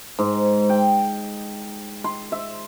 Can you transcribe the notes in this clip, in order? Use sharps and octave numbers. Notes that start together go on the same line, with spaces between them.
G#2
G5
C6
E5